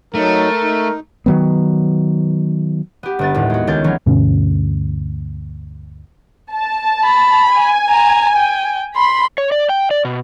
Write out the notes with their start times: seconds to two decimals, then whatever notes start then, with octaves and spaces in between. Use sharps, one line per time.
0.15 F#3 A3 D#4 A#4
0.63 D#4
1.26 D#3 F#3 B3
3.03 B3 G4
3.19 G1 B3 A6
3.34 D#2 A2
3.50 G#3 F#4
3.67 C#2 D#3 C#4 G6 A6
3.84 E3 F#3 C#4
4.06 D2 G2 B2 C#4
6.52 A5
7.04 B5
7.51 G#5
7.90 A#5
8.37 G5
8.96 B5 C6
9.38 C#5
9.52 D5
9.69 G5
9.91 D5
10.05 B2